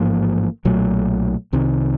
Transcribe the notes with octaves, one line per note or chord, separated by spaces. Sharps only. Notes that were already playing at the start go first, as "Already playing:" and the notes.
Already playing: A1 G#2 F3 A#3
B1 A#2 F#3 A3
C2 C3 D#3